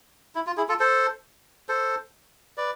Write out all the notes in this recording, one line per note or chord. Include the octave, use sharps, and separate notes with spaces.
E4
F4
E4 G#4
F4 A4
A4 C5
A4 C5
B4 D5